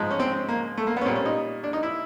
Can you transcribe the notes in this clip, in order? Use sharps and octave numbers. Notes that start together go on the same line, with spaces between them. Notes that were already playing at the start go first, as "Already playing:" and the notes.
Already playing: G#2 F3 G#3
C#4
C4
A#3
A3
A#3
B3
C#4
A#2 G3 C4
C#4
D#4
D4
D#4
E4